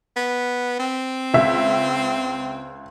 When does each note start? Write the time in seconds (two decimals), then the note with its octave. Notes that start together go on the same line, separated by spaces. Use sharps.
0.16 B3
0.79 C4
1.34 C#2 E5